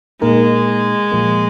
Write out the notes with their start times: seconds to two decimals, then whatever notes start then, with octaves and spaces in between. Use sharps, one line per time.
0.22 A#2 G#3 A#3 D#4 A#4
1.12 A#2 F3 A#3